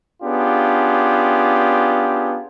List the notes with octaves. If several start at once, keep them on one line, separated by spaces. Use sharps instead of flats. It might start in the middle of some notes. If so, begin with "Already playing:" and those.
B3 C#4 D4 F4 G4 G#4